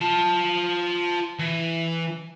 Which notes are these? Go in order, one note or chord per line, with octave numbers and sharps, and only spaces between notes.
F4 A5
E3